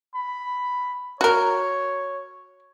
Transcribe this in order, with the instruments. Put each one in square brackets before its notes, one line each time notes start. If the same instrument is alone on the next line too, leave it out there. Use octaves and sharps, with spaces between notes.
[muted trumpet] B5
[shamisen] F#4 A#4 [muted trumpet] C#5